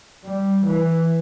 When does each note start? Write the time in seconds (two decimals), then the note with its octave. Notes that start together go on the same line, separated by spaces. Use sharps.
0.24 G3
0.66 E3